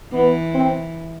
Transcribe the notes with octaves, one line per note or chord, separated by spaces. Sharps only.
E3 B3
C4